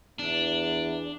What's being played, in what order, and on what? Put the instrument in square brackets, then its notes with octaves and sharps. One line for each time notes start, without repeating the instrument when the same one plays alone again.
[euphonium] E2 [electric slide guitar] D4